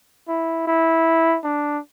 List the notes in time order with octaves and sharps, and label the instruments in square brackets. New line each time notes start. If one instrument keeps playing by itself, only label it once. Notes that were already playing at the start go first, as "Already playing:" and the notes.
[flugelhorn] E4
E4
D4